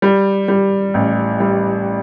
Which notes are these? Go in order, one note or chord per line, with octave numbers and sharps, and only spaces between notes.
G3
G3
A1
G3